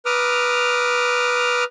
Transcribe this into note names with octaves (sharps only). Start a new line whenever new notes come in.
B4 A#5 D6 D#6 F6